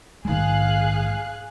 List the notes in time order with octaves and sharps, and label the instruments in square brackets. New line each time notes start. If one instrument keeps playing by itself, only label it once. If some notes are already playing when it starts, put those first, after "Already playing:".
[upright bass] A#1 G#2 [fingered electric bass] D#3 G#3 [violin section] G#4 F5 F#6